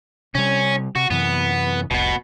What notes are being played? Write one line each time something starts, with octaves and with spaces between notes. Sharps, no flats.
C3 G3 C#4
C3 F#4
F#2 C3 E3 B3
F1 C2 B2 B3